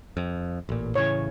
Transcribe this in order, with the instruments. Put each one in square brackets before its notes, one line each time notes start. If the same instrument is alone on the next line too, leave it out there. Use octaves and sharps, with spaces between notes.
[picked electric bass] F2
A1 A#2
[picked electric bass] A2 C#3 E3 [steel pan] C#5